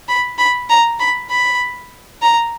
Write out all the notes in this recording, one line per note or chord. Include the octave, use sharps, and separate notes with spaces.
B5
B5
A#5
B5
B5
A#5